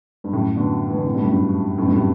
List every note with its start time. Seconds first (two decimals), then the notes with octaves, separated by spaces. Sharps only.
0.24 G2
0.32 F#2 A2
0.56 B2 D3
0.90 E3
0.97 D3
1.05 A2 C3
1.14 G2 B2
1.23 F#2 A2
1.32 G2
1.78 F#2 A2
1.86 G2 B2
1.95 A2 C3